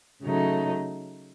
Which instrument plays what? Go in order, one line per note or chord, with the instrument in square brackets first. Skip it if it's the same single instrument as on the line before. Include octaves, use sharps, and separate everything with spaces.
[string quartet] C#3 F#3 A3 D#4